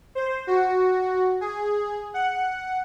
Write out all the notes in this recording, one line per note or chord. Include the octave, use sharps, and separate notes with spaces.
C5
F#4
G#4
F#5